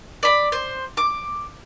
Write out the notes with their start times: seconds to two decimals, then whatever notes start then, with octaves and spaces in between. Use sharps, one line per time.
0.23 D5 B5
0.52 C5
0.97 D6